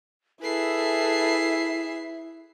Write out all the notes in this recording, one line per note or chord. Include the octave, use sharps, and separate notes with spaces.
E4 G#4 A4 B4 E5 C7